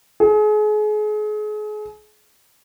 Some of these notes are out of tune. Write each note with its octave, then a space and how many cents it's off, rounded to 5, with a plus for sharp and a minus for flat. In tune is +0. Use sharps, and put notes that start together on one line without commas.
G#4 +35